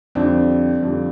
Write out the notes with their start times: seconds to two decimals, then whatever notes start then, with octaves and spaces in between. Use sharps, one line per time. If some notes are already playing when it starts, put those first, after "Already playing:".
0.15 F2 D3 G3 C4 D4
0.83 F2 D3 G3